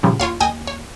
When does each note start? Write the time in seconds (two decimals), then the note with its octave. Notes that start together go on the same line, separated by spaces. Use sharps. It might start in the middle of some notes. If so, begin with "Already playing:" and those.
0.03 A#2 C#3 F3 G3
0.20 D#2 F4 C#5 F5
0.40 D#2 D#5 G5 G#5
0.67 C#5